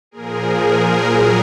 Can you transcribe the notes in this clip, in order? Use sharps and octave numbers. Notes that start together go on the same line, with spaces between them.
A#2 F3 G#4 A#4
A#2 F#3 G#4 A#4